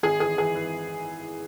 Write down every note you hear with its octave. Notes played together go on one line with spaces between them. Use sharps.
G#1 G#4
E3 G#4
E3 G#4
E3